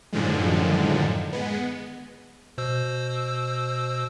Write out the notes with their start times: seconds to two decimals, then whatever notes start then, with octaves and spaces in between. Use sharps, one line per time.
0.13 F#2 A2 D3 D#3 F3 G#3
1.33 G#3 B3
2.58 B2 C5 E6